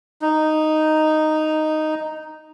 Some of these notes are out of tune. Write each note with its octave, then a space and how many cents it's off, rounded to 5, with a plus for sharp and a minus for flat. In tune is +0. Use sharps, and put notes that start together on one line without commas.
D#4 -5